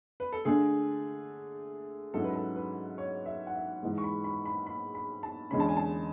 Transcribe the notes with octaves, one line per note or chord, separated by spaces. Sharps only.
B4
A4
D3 A3 D4 G#4
G#2 F#3 C#4 E4 A4
B4
A4
B4
C#5
E5
F#5
E5
G#2 E3 G#3
C#6
B5
B5
B5
B5
B5
A5
E2 D3 G#3 C#4 B5
A5
G#5
A5